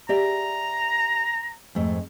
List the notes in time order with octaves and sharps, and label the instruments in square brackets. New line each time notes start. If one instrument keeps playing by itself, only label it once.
[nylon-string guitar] G4 D5 E5 [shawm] A#5
[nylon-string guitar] F2 G#2 A3